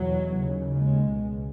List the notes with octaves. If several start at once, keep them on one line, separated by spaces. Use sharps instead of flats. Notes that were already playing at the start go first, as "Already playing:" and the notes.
Already playing: E2 B2 F#3
D#2 C#3
G#3
C#2 B2